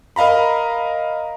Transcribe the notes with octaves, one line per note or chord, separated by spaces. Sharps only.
A#4 D#5 F5 A#5 B5